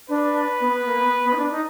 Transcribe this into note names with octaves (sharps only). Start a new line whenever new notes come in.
D4 B4
B3
B3
A#3
B3
B3
D#4
D4
D#4